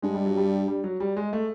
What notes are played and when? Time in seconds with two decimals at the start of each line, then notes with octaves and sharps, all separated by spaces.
0.02 G2 G#3
0.14 G3
0.26 F#3
0.37 G3
0.68 G3
0.84 F#3
1.00 G3
1.17 G#3
1.33 A3